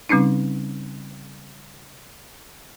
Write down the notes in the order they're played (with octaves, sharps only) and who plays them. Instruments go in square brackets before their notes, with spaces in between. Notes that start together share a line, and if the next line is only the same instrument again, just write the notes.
[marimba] C#3 G3 C4 C#4 D#4